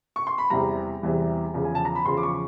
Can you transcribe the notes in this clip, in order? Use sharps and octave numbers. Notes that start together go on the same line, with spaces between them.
C#6
C6
B5
E2 C3 E3 G3 A#5
E2 C3 E3 G3
E2 C#3 F3
G#5
A5
A#5
B5
E2 C#3 F3 C6
D6
C#6